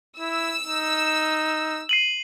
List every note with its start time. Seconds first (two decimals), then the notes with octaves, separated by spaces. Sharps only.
0.20 E4 E6
0.64 D#4
1.89 C7 D#7 F#7